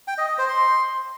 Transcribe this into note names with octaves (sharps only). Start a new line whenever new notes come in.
G5
D#5
D#5
C5
C6